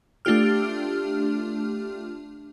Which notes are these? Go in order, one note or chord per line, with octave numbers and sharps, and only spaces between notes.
A3 D4 F4 G4 F6